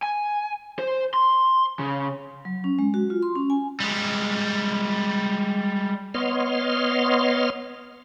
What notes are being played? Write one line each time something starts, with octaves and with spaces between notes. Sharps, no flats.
G#5
C5
C6
C#3
F#3
C#4
G#3
F#4
F4
C6
C#4
G#5
G3 G#3
B3 C#5 D#5 C6 F6